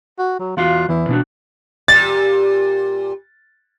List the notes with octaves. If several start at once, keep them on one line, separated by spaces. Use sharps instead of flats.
F#4
F#3
E2 F4 F#4 F5
E2 E3
B2 D4 F#4
A#2 G3 A6